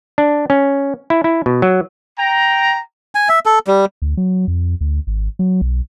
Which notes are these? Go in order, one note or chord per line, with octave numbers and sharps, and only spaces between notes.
D4
C#4
E4
E4
B2
F#3
G5 A#5
G#5
E5
A4
G3
D2
F#3
F2
D2
G#1
F#3
B1